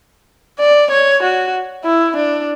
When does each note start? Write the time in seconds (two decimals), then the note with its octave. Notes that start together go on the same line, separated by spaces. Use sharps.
0.60 D5
0.91 C#5
1.23 F#4
1.85 E4
2.16 D4